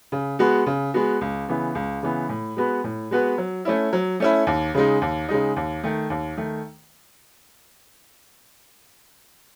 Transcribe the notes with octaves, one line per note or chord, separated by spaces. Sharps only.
C#3
G#3 B3 F#4
C#3
G#3 B3 F#4
C#2
C#3 E3 B3
C#2
C#3 E3 B3
A2
G#3 B3 F#4 B4
A2
G#3 B3 F#4 B4
F#3
A3 C#4 E4
F#3
A3 C#4 E4
D#2
C#3 G#3 D#4
D#2
C#3 G#3 D#4
D#2
D#3 A3
D#2
D#3 A3